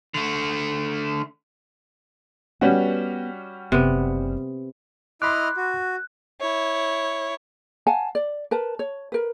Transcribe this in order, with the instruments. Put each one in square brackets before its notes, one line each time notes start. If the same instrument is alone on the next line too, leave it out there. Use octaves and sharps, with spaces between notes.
[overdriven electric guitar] D3 A3
[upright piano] G3 C#4 F#4 [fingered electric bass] B3
[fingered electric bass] F#1 [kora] C3 B3
[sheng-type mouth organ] E4 D#5 F6 [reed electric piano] B5 C6 D6 [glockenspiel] F#6
[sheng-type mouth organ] F#4
[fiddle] E4 C#5
[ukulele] F5 F#5 G#5 A5
D5
A#4 B4 A5
C#5
A#4 B4